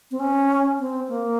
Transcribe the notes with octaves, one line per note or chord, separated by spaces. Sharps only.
C4
C#4
C4
A#3